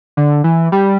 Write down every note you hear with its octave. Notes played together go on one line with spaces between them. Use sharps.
D3
E3
G3